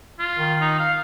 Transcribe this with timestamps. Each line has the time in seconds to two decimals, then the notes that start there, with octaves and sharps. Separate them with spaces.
0.19 F4
0.37 D#3
0.61 D#4
0.79 F5